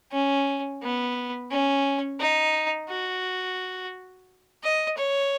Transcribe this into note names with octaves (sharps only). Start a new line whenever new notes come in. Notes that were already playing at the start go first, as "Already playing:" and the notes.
C#4
B3
C#4
D#4
F#4
D#5
C#5